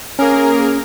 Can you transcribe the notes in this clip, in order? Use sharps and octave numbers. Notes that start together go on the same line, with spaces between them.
A#3 C#4 G#4 A#4